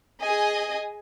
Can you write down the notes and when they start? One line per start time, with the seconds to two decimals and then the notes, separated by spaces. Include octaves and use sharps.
0.23 G#4 D#5 G#5